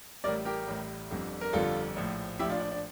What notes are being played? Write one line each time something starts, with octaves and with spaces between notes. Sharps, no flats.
A1 A2 G3 A#4 D5
G4 A#4
A1 A2 G3
G1 F2 D3 G3
A#4
G1 F2 D3 G3 F4 A4
A#1 A2 F3
A#1 A2 F3 E4 G4
D4 F4
D4
D4